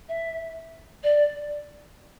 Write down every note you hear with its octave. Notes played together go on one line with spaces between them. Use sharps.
E5
D5